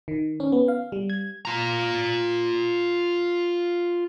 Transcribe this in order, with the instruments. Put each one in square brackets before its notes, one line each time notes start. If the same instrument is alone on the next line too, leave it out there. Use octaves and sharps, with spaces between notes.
[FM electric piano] D#3
C#4
B3
F5
G3
G#6
[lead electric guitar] F4 A#5